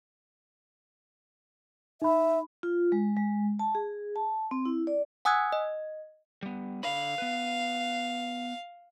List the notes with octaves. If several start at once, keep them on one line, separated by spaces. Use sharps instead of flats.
D#4 E5 B5
F4
G#3
G#3
A5
G#4
A5
C4
E4
D5
F#5 G#5 D#6 E6 F#6 G#6
D#5
G3 B3
D3 F5 B5
B3 B4